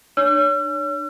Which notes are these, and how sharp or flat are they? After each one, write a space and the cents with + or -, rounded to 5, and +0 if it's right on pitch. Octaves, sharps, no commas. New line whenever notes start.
D4 +35 C#5 +25 E6 +45